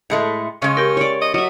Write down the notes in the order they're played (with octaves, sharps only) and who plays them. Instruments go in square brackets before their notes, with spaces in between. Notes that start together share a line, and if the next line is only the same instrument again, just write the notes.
[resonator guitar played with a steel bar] A2 G#3 A3
[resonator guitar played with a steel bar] C#3 G#3 [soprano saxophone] C#4
[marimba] G4 A#4 [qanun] G5
[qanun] C#5 D5
[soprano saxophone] D#5
[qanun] F#3 E5 [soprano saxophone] D#5